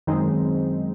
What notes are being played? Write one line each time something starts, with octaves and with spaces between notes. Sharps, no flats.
F#2 D#3 G#3 C4 D#4